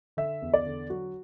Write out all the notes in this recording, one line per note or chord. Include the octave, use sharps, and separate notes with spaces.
D3 E5
E2
D5
D3
F#3 F#4